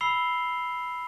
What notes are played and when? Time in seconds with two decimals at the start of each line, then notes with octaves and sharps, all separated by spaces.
0.01 B5 E6 C7 F7 G7